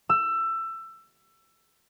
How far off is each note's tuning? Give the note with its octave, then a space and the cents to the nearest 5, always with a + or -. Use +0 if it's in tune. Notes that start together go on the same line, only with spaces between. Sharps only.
E6 +20